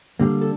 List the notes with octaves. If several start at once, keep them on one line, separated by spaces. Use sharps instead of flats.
D3 G3 A#3
A4